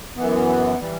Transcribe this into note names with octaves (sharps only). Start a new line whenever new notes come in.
F#2 E3 B3
E3 G3